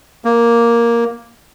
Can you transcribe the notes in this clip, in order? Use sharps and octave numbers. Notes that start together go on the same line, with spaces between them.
A#3